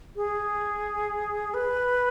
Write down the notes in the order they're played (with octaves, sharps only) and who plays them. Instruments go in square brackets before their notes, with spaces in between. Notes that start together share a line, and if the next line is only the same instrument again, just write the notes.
[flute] G#4
B4